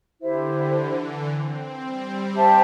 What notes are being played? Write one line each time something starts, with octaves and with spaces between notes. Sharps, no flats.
D3 E4 G4 C5 E5
E3
C4
G3
G4 C5 E5 A5